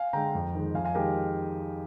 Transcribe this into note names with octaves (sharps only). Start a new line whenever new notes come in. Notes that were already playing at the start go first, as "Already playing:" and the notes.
Already playing: F5 G#5
D3 G#3 G5 A#5
F2
D#3 G#3
F2 F5 G#5
F5 G#5
D#3 G#3 G4 A#4